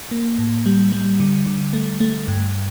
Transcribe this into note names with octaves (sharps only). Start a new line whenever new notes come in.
A#3
A2
G3
G3
D3
D3
A3
A3
G2